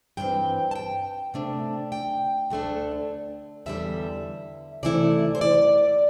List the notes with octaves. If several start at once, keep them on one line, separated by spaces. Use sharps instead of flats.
G2 E3 C4 G5
A5
G5
C3 A3 D4
G5
D2 D3 A3 D4
E2 D3 G3 E5
C3 E3 A3 E4 D5
C5
D5